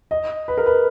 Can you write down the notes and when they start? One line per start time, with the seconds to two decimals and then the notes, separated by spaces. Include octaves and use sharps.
0.11 D#5
0.48 B4
0.58 A#4
0.66 B4